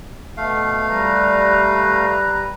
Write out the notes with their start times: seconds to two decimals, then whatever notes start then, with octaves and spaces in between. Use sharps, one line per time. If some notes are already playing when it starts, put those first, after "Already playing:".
0.37 B2 A3 F5
0.89 G3 B4 A#5